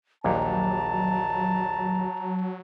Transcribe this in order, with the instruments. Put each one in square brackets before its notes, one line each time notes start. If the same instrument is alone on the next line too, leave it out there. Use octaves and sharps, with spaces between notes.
[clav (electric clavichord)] A#1 D#2 A#2 [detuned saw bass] F#3 [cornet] A5 [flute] A#5